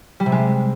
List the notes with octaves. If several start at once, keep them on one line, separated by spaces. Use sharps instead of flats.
G3
C3
G#3